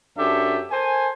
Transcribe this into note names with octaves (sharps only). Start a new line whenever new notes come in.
F#2 D4 G4 A4 E5
A4 A#4 C5 G#5